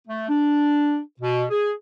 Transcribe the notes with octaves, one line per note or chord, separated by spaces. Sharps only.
A3
D4
B2
G#4